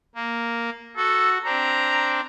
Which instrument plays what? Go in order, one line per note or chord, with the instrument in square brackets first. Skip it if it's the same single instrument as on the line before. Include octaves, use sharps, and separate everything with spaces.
[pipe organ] A#3
[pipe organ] F#4 [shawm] A4
[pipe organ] C4 D4 [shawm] A#5